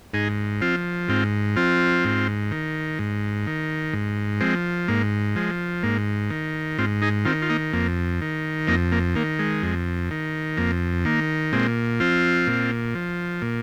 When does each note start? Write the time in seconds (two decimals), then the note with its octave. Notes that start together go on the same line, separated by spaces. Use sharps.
0.14 G#2 D#4 G#4
0.61 F3 C4 F4
1.08 G#2 C4 F4
1.56 F3 C4 F4
2.04 G#2
2.51 D#3
2.99 G#2
3.47 D#3
3.93 G#2
4.40 F3 G#3 C4
4.88 G#2 A#3
5.36 F3 G#3
5.83 G#2 A#3
6.30 D#3
6.78 G#2 C4 F4
7.02 D#4 G#4
7.25 D#3 C4 F4
7.42 F4
7.50 A#3 D#4
7.73 F2 A#3
8.21 D#3
8.67 F2 A#3 D#4
8.92 A#3
9.15 D#3 A#3
9.39 G#3
9.62 F2
10.11 D#3
10.57 F2 A#3
11.05 D#3 A#3
11.53 A#2 G#3 C4
12.00 F3 C4 F4
12.47 A#2
12.95 F3
13.42 A#2